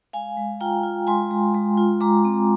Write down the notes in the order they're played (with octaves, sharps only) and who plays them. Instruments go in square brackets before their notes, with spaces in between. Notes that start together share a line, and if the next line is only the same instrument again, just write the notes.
[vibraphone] G#3 F5 G#5
G#3
F4 G5 A#5
F4
G#3 G#5 C6
G#3
G#3
F4
G#3 A#5 D6
C4